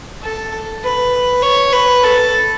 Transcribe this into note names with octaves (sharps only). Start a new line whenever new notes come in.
A4
B4
C#5
B4
A4